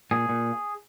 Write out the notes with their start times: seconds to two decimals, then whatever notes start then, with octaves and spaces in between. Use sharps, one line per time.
0.11 A#2 G#4
0.29 A#2